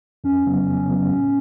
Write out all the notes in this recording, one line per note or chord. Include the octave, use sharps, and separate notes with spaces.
F2 C#4
C#3 F#3 B3
F2
C#3 F#3 B3
A2